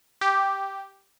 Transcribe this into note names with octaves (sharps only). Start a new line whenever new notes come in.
G4